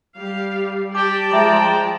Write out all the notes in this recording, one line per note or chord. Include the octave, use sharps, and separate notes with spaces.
G3 G4 F5
G4 D5 A5 D6
F3 G#3 E5 G5 A#5 D6